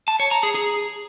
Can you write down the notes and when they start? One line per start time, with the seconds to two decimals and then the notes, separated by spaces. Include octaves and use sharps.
0.08 A5
0.20 C#5
0.31 A#5
0.43 G#4
0.55 G#4